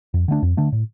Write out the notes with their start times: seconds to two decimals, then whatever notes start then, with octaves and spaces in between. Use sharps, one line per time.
0.14 F2
0.28 D3 A3 D4
0.42 F2
0.57 D3 A3 D4
0.72 A2